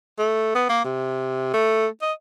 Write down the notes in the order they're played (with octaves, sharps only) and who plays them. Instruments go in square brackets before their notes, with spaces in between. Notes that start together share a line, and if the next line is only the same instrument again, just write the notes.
[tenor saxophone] A3
B3
A#3
C3
A3
D#5